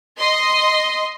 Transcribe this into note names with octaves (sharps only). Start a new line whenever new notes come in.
D#5 C6